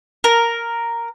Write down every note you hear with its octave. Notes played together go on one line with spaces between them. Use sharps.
A#4